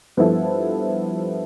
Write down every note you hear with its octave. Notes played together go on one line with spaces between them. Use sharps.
G2 F3 B3 E4 A4